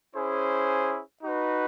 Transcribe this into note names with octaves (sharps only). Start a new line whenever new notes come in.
C#4 E4 G#4 C5
D#4 F#4 B4